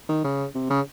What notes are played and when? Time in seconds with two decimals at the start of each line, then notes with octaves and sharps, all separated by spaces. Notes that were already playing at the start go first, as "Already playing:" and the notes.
0.09 D#3
0.24 C#3
0.55 C3
0.70 C#3